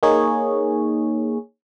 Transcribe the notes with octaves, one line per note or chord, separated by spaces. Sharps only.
A#3 D#4 G#4 C#5